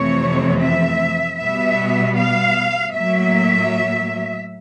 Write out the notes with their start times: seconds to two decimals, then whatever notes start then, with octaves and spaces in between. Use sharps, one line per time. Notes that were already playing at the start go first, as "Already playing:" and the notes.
Already playing: F2 C3 E3 A3 C4 C#5
0.61 E5
1.39 B2 G3 B3 E5
2.17 F5
2.94 A2 F#3 A#3 E5